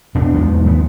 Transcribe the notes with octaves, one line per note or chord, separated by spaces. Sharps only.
E2 B2 D4
E2 G#2 B2 F3
D#2 B3